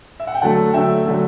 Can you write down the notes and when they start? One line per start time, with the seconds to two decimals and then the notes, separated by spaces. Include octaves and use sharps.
0.20 E5
0.27 F#5
0.35 G5
0.42 D3 F#3 A3 F#5 A5
0.73 D3 F#3 A3 E5 G5
1.06 D3 F#3 A3